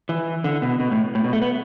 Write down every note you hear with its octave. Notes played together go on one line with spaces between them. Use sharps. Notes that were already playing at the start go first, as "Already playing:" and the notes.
E3
D3
B2
B2
A2
A2
B2
A3
B3